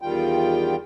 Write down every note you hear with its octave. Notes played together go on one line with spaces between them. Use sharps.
E2 D#3 G3 F4 G5